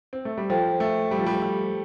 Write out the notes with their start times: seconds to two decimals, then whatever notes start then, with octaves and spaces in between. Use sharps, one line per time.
0.13 C4
0.25 A3
0.38 G3
0.50 F3 A4 C5 G5
0.80 A3
1.11 G3
1.19 F3
1.26 G3
1.42 G3